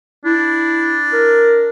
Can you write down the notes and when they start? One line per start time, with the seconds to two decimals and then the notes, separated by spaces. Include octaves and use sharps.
0.25 D4 E4
1.13 A#4